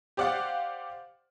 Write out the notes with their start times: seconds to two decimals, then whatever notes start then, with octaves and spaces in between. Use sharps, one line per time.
0.17 G4 C5 D5 F5 F#5